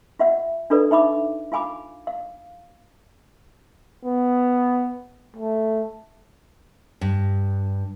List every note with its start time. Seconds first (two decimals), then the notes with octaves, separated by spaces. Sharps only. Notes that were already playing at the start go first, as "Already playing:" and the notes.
0.19 F4 E5 F#5
0.70 D4 F4 A4 B4 D5
0.91 D#4 E5 B5 D6
1.52 F4 F5 G#5 B5 D6
2.07 F5
4.05 B3
5.37 A3
7.01 G2